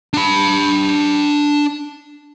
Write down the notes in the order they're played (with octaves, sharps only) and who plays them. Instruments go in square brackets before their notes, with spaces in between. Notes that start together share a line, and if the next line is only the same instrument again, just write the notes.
[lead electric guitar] D4 B5